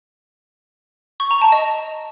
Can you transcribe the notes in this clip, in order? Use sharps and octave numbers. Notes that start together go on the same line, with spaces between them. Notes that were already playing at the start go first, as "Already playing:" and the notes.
C#6
A#5
A5
D#5